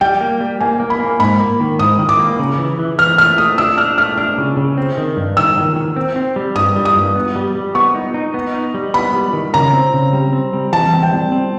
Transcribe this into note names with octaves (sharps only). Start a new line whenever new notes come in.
G3 G5
A#3
G3
A#3 G#5
A#3
B5
A#3
G#2 B5
A#3
D#3
G#2 D#6
D#3
D6
A#3
C#3
E3
E3
E3 F6
A3 F6
A3 D#6
D4 E6
D4 F6
A3 F6
D4 F6
C#3
C#3
C4
D#3
G2
D#3 E6
D#3
D#3
C4
C4
G3
G2 D#6
G3
D#6
G2
B3
G3
G3
B3 C#6
D#4
D#4
B3
D#4
G3
B3 B5
G3
D#3
C#3 A#5
C4
C#3
G3
C4
G3
E3 A5
C4
G5
G3
C4